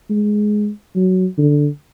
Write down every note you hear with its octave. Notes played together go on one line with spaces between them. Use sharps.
G#3
F#3
D3